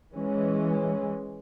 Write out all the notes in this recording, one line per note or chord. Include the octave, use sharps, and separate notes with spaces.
E3 G#3 C#4